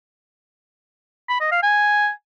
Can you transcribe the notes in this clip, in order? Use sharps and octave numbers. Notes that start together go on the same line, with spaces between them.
B5
D#5
F5
G#5